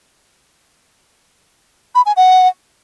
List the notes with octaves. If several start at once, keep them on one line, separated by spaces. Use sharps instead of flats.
B5
G#5
F#5